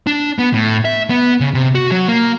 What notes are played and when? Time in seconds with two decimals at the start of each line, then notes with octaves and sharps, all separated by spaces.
0.07 D4
0.39 B3
0.54 A2
0.85 E5
1.10 B3
1.40 C#3
1.54 C3
1.75 F#4
1.91 F#3
2.08 A#3